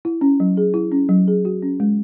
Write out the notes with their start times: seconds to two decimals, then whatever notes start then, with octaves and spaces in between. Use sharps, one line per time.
0.05 E4
0.21 C#4
0.40 F#3
0.57 G#4
0.74 E4
0.92 C#4
1.09 F#3
1.28 G#4
1.45 F#4
1.63 C#4
1.80 G#3